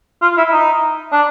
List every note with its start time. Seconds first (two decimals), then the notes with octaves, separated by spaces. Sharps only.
0.22 F4
0.37 E4
0.52 D#4
1.13 D4